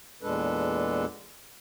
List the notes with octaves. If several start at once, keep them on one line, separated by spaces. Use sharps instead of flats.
E2 A#2 G#3 D4 A4 B4